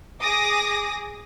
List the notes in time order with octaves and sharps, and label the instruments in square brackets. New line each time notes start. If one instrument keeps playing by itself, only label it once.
[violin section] G#4 D6 D#6 A#6